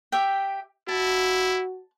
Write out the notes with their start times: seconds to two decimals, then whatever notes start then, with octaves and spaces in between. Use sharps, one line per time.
0.12 G4 E5 G5
0.88 E4 F#4 A5